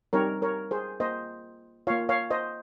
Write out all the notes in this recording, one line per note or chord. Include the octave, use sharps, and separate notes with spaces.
G3 C4 D#4 G4 A#4 C#5
A#4 C#5
G#4 C5
A#3 F4 C5 D#5
A#3 F4 C#5 F5
C#5 F5
C5 D#5